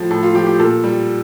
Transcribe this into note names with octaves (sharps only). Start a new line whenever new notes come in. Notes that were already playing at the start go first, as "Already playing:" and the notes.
Already playing: A2 F3
A2 A4
F4
F3 G4
G4
A#2 A4
G3